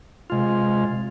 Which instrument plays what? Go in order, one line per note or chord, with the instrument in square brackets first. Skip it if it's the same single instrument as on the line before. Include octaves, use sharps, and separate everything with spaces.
[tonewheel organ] C3 G#3 F4